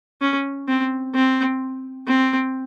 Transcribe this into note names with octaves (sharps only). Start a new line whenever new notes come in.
C#4
C4
C4
C4